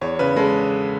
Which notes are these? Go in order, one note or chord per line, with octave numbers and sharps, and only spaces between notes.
E2 C#5
C#3 B4
G#3 A4